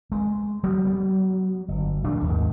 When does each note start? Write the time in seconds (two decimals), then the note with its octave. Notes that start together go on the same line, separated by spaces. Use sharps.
0.12 G#3
0.63 F#3 G3 A#3 B3
0.85 F#3 B3
1.68 G1
2.04 A#1 A#2 A3 D4
2.24 D#2 G#2